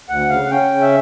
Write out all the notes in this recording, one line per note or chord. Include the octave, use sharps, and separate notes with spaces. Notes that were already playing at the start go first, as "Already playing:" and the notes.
D2 F#5
C#3 F5
F#5
C#4 G5
C#3
E5